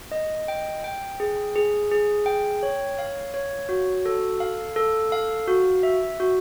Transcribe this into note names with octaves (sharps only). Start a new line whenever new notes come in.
D#5
G5
G5
G#4
G#4
G#4
G5
C#5
F5
C#5
F#4
A4
F5
A4
F5
F#4
E5
F#4